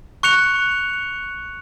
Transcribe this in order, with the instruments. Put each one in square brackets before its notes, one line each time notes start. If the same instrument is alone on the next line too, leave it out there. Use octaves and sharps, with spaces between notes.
[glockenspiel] C#6 F#6 C#7 F7